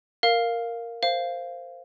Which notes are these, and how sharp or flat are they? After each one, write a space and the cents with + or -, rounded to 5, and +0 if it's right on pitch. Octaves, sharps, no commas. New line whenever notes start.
A#4 -5 F5 +0
C5 +0 F5 -10